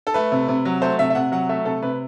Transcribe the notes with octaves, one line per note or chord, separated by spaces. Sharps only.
A4
A3 B4
C3
C3
F#3
A3 C5
C3 E5
E5
C3 F#5
F#3 F#5
A3 E5
C3 A4
C3 B4